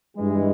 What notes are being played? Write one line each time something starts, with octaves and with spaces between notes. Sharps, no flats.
G2 E3 G#3